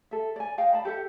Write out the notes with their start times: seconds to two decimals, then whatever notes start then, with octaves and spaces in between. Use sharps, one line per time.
0.11 A4 E5
0.36 D5 G#5
0.58 D#5 F5 G5
0.73 D5 A5 B5
0.85 G4 A4 E5 F#5